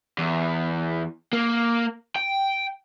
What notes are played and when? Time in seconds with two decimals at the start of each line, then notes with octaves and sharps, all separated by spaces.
0.18 E2
1.33 A#3
2.16 G5